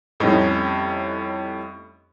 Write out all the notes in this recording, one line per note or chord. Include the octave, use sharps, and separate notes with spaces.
F2 A2 G3 C#4 D#4